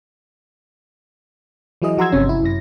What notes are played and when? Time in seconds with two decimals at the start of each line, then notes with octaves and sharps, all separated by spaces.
1.82 E3 F#3 E4 G#4 D#5
1.98 F3 F#4 A#5 C6 E6 G#6
2.12 G1 C3 C#4
2.29 E4
2.43 F#2 A#6